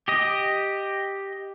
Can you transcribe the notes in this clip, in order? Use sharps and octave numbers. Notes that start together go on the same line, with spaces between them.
G4 D#5